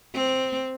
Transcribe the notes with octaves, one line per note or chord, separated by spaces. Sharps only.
C4